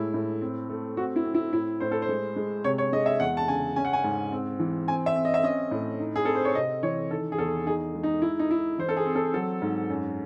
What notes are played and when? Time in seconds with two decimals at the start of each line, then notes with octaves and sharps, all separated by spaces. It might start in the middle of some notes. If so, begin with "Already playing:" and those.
Already playing: A2 G#3 E4
0.14 A2
0.41 C4
0.70 A3
0.97 C4 F#4
1.16 E4
1.25 C4
1.34 E4
1.53 A2 E4
1.80 A2 C5
1.91 A4
2.02 C5
2.09 G#3
2.36 G#3
2.64 C3 C#5
2.78 C#5
2.93 G#3 D#5
3.06 E5
3.20 E2 F#5
3.37 A5
3.48 C#3 G#5
3.76 C#4 G#5
3.85 F#5
3.93 G#5
4.04 G#2
4.32 C4
4.59 E3
4.88 C4 G#5
5.06 E5
5.16 C4
5.25 D#5
5.34 E5
5.43 C#4 D#5
5.71 A2
5.99 D#4
6.16 G#4
6.25 C4 A4
6.35 C5
6.45 C#5
6.55 C3 D#5
6.83 E3 C#5
7.11 D#3 A4
7.32 G#4
7.38 E2 A4
7.67 D#4 G#4
7.95 G#3
8.03 D#4
8.22 D#4 E4
8.39 D#4
8.50 D#4 E4
8.78 E3 C5
8.89 A4
8.97 G#4
9.06 C4
9.15 A4
9.34 F#3 A4
9.62 G#2
9.90 F#2